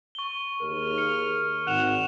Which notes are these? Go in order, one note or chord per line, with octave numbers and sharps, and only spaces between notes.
C#6 G7
D#2 G#4 A#4 F6
C#7
G#1 F#5 F#6 E7 F7